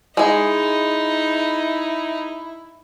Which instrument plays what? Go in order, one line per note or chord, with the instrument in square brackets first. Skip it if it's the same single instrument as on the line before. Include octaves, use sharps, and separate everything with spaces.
[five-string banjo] G#3 G#4 [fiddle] D#4 [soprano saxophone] E4